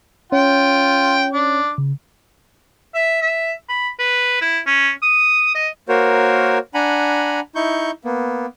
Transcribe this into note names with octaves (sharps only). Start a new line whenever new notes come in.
C#4 F4 C#5 G5
D4 D6
C#3
E5
E5
B5
B4
E4
C#4
D#6
D#5
A#3 F#4 A#4 C5 C#5
D4 F#5 G#5 A#5 B5
D#4 E4 C#6 G6
A#3 B3